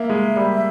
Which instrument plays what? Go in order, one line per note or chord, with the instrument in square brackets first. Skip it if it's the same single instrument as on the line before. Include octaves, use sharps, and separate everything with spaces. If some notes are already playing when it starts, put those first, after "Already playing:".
Already playing: [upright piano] A#3 [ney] E5
[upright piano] G#3
G3